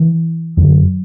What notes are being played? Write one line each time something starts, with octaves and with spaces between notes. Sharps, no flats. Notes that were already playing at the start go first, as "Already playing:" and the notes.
Already playing: E3
F#2 D3 F#3